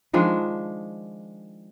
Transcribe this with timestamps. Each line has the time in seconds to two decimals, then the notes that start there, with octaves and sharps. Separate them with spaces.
0.13 D#3 F3 G#3 D4